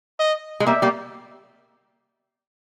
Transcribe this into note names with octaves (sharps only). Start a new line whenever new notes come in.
D#5
G#3
G3 A#3 E5
G3 A#3